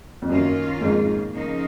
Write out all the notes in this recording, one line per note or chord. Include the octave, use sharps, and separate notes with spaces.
F2
F#2 D#3 A#3 C#4 F4
F2 G#2
C#3 F3 A#3 D#4